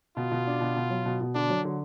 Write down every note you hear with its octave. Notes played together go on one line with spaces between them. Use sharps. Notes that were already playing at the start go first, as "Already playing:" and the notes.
B2 F4
B2
D4
B2
B2
F#3
B2
B2
D3 D4
F#3
D3